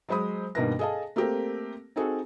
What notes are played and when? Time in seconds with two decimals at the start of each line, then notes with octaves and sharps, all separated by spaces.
0.09 F#3 G#3 C5 B5 D#6
0.55 G2 B2 D#3 A#3 B4 A#6
0.79 G#4 A4 D#5 F5 A5
1.16 A3 A#3 C4 G4 A#4
1.96 C4 D#4 F#4 G#4 A4